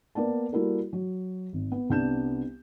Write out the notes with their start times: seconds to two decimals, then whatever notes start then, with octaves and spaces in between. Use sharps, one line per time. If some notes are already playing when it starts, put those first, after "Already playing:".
0.15 A#3 B3 D5 A5
0.52 G3 A#3 E4 F#4 A4 A#4
0.93 F#3
1.53 G#1
1.72 B3
1.90 C2 B3 D4 G6 E7